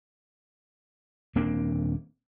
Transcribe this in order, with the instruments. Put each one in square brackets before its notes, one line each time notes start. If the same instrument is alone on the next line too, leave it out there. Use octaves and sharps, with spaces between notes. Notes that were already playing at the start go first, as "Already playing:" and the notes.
[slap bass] D#1 A#3 C4 D4